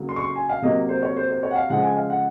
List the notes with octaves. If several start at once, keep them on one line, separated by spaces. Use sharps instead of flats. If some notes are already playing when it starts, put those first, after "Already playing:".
Already playing: C#3 F#3 A#3
C6
C#6
C6
G#5
F5
C3 F#3 A#3 D#5
C5
C#5
C5
C5
C#5
F#5
F5
C#3 F3 G#3 F#5
G#5
F5
F#5